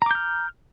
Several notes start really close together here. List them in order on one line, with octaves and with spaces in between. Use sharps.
A#5 D6 G6 F6